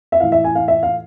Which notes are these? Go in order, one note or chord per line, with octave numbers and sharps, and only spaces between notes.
E5
A2 E3 F5
E5
G#5
F5
E5
F5